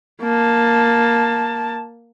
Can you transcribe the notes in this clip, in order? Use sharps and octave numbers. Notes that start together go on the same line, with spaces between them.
A#3 A5